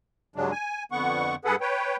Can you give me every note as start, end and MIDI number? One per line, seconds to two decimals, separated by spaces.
0.36 0.51 43
0.36 0.51 49
0.36 0.51 54
0.36 0.51 56
0.36 0.51 62
0.52 0.84 80
0.92 1.35 41
0.92 1.35 50
0.92 1.35 59
0.92 1.35 78
0.92 1.35 85
1.45 1.56 43
1.45 1.56 68
1.45 1.56 69
1.45 1.56 71
1.45 1.56 78
1.61 1.96 71
1.61 1.96 73
1.61 1.96 79